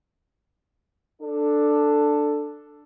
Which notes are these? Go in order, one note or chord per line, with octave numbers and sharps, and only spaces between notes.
D4 A4